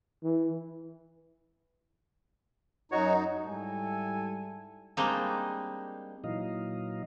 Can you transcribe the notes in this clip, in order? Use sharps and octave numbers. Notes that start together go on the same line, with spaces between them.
E3
F#2 D#4 F#4 C#5
G#2 G3 E4 A4 G#5
G3 G#3 A#3 C4 D4 D#4
A#2 E3 F#3 D#4 D#5 F5